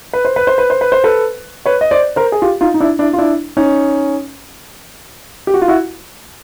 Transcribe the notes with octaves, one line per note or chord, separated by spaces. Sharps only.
B4
C5
B4
C5
B4
C5
B4
C5
A4 B4
B4 C#5
D#5
C5 D5
A#4 C5
G#4
F4 G4
D#4 F4
D#4
D4 E4
D4 E4
F4
D4 E4
C#4 D#4
G4
F#4
F4
E4 F#4